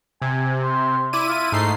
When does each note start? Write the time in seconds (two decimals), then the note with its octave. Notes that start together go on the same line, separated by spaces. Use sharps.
0.22 C3 G#5
0.62 C5
1.13 E4 D5 D#7
1.29 F4
1.52 G#2 A3 D#4 C7